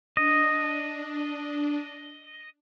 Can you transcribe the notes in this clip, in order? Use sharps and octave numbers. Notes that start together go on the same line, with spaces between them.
D4 D#5